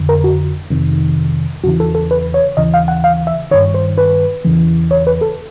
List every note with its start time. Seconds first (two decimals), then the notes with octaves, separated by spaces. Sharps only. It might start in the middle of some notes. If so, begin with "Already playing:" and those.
Already playing: F2 D3
0.09 A#4
0.24 F#4
0.70 F2 C3 D#3
1.64 E2 C#3 E3 F#4
1.80 A4
1.95 A4
2.11 B4
2.34 C#5
2.57 D#2 C#3 E3 D#5
2.74 F5
2.88 F#5
3.04 F5
3.27 E5
3.51 G2 D#3 C#5
3.74 C5
3.98 B4
4.45 E2 C#3 E3
4.91 C#5
5.07 B4
5.21 A4